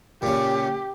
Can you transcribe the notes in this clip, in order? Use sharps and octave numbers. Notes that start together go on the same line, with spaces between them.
A#2 C#3 G4